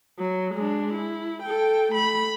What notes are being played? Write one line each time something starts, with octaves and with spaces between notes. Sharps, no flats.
F#3
G#3 D4
E4
A4 G5
A3 B5